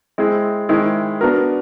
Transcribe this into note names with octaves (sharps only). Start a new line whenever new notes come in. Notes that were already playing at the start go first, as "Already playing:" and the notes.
G#3 C4 E4 G#4
D#3 G#3 C4 E4 G#4
B3 D4 F#4 A#4